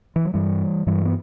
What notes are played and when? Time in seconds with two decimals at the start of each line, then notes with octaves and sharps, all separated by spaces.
0.16 E3
0.25 F#3
0.34 G2 E3 G3
0.87 G2 E3 G3
1.05 B3